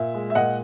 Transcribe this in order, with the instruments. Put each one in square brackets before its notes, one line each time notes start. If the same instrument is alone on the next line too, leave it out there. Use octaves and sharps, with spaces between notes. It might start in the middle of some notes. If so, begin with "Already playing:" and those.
Already playing: [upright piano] A#2 E5
G#3
E5
A#2 D#5 F#5